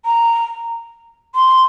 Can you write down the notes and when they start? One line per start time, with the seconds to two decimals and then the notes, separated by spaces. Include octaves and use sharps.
0.05 A#5
1.35 C6